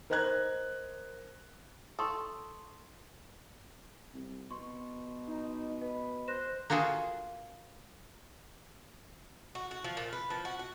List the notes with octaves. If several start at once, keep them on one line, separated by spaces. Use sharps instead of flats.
A#4 C5 D#5 A#5 F#6 G#6
A4 C6 C#6 D#6
C2
B2 C6 C#6
D#4
B4 D#5
C5 F#6 A#6 E7
A#3 F4 F#4 G#4 A4
F#4
F#4
F3
A#2
B4
F3
F#4
F#4